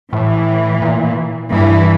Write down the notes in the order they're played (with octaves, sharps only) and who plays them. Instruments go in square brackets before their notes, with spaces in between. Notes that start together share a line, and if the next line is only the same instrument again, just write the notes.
[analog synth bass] A2 [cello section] E3
[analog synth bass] A#2
[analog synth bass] G2 [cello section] E3